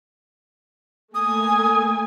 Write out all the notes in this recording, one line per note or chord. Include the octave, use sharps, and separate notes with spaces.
A3 A#3 G#5 D#6